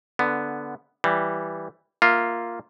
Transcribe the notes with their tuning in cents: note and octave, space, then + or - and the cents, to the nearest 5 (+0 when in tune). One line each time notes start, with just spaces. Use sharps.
D3 +0 B3 +0
E3 +0 G3 +0
A#3 +0 F4 +0 E5 +10